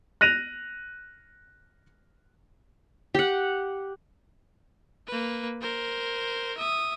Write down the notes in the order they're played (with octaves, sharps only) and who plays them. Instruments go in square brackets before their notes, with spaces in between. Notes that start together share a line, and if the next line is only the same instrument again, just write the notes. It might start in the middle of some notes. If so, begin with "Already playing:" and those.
[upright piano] F#6 A#6 D#7 F7
[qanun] G4 F#5
[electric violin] A#3 B4
A#4 C5
E5 D#6